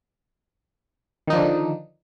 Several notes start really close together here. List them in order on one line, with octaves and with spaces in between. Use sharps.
D#3 D#4 F3 D4 D3